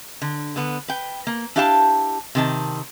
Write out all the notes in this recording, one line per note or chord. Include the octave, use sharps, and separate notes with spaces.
D3
D3 B3
B4 G5
A#3
D4 E4 G4 F5 F#5 A5
C3 D#3 A5